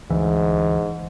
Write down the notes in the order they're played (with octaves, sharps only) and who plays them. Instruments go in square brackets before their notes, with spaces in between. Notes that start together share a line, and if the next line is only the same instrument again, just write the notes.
[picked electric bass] D2 E3 [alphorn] G#2